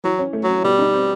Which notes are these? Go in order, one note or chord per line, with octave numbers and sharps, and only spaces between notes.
E3 F#3
C#4
A3
F#3 C#4
B2 G3
D#4
C4